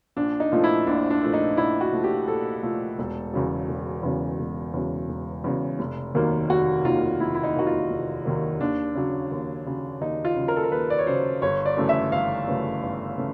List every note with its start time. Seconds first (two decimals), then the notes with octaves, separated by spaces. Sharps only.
0.16 A#1 D4
0.40 D#4
0.52 A#2 F3 A3
0.64 E4
0.87 A#1 D4
1.10 D4
1.23 A#2 F3 A3
1.34 D#4
1.57 A#1 E4
1.81 F#4
1.93 A#2 F3 A3
2.04 G4
2.28 A#1 A4
2.63 A#2 F3 A3
2.98 E1
3.33 E2 C#3 F#3
3.68 E1
4.03 E2 C#3 F#3
4.39 E1
4.74 E2 C#3 F#3
5.09 E1
5.44 E2 C#3 F#3
5.79 F1
6.15 D#2 D#3 F#3 A#3
6.49 F1 F#4
6.85 D#2 D#3 F#3 A#3 F4
7.20 F1 E4
7.35 E4
7.43 D#4
7.55 D#2 D#3 F#3 A#3 F#4
7.67 F4
7.90 F1
8.25 D#2 D#3 F#3 A#3
8.61 D#2 D4
8.95 C#3 F#3
9.31 D#2
9.66 C#3 F#3
10.01 D#2 D#4
10.25 F4
10.36 C#3 F#3
10.48 A#4
10.56 A4
10.64 A#4
10.72 D#2 B4
10.90 D5
10.98 C#5
11.07 C#3 F#3 C5
11.42 G1 C#5
11.66 D5
11.77 F#2 C#3 E3 A3
11.89 E5
12.12 G1 F5
12.47 F#2 C#3 E3 A3
12.83 G1
13.18 C#3 E3 A3